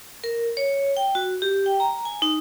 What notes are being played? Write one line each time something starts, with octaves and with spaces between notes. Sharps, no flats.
A#4
C#5
G5
F#4
G4
G5
A#5
G#5
D#4